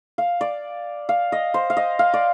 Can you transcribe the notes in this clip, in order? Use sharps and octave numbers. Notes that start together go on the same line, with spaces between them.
F5
D5
F5
D#5
C5
F5
D#5
F5
D5